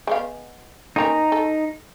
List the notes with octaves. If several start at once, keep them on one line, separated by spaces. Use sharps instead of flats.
G#3 B3 F5
A#3 C4 C#4 D#4 A#5
A4